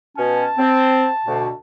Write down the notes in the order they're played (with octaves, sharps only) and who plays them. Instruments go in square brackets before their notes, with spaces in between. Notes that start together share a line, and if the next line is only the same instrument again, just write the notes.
[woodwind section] B2 C#4 [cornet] A5
[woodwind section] C4
D2 B2